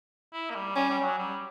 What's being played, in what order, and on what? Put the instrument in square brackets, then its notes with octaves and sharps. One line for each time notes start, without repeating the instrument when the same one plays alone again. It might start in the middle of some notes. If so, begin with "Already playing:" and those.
[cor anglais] E4
A#3
G3
[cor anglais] G3 [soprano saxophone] C#4
[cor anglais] G3
G3
F#3
G3